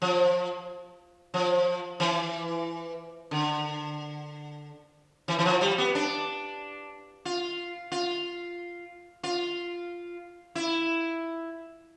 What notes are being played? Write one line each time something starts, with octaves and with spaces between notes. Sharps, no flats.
F3
F3
E3
D3
E3
E3
F3
G3
B3
D4
F4
F4
F4
E4